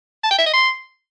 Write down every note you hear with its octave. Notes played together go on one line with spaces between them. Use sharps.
A5
G5
E5
D#5
C6